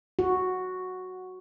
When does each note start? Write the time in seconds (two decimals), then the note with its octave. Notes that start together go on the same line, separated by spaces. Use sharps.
0.19 F#4